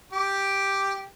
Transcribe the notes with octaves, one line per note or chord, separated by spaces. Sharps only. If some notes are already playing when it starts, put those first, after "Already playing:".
G4 D6